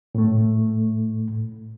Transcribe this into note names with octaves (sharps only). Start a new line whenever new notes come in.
A2 A3